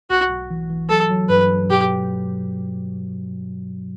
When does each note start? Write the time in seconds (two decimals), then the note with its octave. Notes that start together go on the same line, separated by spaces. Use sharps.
0.10 B1 F#4
0.30 B1
0.50 E3
0.70 E3
0.90 F#3 A4
1.10 F#3
1.29 G2 B4
1.50 F#3
1.70 B2 G4